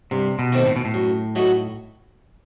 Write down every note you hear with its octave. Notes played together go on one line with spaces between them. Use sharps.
G2 C3
B2
D#3 A3 C4
A2
B2
A2
F#2
F#3 A3 D#4 F#4